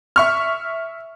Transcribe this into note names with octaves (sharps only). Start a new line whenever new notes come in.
E5 C#6 F6